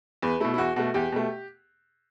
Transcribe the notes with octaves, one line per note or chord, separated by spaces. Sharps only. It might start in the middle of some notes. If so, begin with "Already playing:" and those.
E2 B4
B2 A3 E4
E4
E2 F#4
B2 A3 F#4
E2 G4
B2 A3